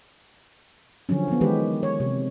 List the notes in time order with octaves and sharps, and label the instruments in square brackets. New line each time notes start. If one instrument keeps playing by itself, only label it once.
[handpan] D3 F3 F#3 C#4
F3 B3
D#3 E3 G#3 G4 B4
C#5
C3